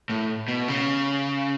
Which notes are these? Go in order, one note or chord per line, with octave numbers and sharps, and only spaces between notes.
A2
B2
C#3